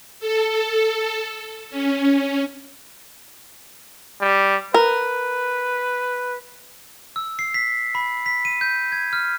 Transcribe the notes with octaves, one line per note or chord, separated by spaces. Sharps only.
A4
C#4
G3
A#4 B4
E6
C7
B6
B5
B6
D#7
G6
G#6
F6